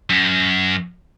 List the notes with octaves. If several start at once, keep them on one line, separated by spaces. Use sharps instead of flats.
F#2